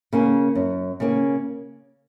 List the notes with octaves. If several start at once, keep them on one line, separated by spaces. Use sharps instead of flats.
C#3 A#3 C#4
F#2
C#3 A#3 C#4